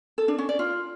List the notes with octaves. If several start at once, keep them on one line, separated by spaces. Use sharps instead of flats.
A4
D4
C#4
D5
F4